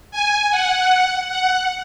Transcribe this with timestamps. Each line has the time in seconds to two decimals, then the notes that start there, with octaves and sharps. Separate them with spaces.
0.11 G#5
0.51 F#5
1.29 F#5